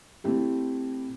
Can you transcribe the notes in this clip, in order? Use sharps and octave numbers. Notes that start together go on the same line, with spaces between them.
A3 C4 E4 G4